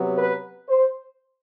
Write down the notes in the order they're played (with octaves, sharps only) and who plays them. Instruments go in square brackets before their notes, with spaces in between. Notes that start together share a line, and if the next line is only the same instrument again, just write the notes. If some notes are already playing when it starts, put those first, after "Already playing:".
Already playing: [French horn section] C3 F#3 B3
B4
C5